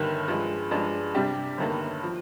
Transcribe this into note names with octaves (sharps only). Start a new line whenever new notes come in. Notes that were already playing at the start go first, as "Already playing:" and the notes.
Already playing: G1 G2 D#3
G2 F3 G#3
G2 F3 G#3 D4
C3 G3 D4 G4
G1 G2 D#3 A#3
F3